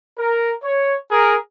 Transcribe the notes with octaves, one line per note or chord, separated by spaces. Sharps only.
A#4
C#5
G#4 A#4